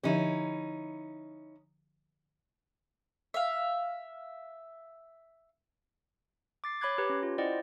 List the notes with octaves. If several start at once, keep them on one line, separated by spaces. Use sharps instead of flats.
D3 F3 C#4 D#4 E4 G4
E5 F5
D6 A6 C7
C#5 B5 D6 F#6 G#6 C7
G4 B4 C#5 A#5
C#4
F4
E4 C5 D5 D#5 F#5 G5